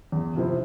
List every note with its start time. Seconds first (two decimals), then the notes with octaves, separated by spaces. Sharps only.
0.12 E2
0.36 C3 F3 C4 E4